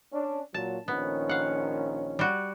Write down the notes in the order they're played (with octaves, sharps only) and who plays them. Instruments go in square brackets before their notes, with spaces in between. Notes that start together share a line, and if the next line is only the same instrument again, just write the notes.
[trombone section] C#4 D4
[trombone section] A#2 F#3 [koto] A5
[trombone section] A#1 D#3 C#4 [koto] B3
[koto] F5 F#5
G3 F#4